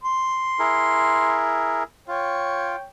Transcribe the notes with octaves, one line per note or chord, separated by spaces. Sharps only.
C6
E4 G#4 A#4
F4 C#5 G5